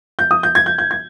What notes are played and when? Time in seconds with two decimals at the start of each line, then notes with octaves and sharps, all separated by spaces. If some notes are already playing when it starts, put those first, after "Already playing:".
0.19 G6
0.31 D#6
0.43 G6
0.55 G#6
0.66 G6
0.78 G6
0.91 G#6